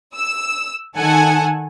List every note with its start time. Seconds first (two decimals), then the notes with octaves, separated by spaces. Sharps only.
0.15 E6
0.96 D#3 A4 F#5 G#5